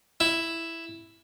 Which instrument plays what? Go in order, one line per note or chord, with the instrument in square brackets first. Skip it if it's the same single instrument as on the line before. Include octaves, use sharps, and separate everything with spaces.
[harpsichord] E4